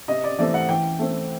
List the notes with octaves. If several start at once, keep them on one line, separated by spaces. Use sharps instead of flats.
C3 D#5
D5
E3 A3 C4 D5
F#5
E3 G5
A3 C4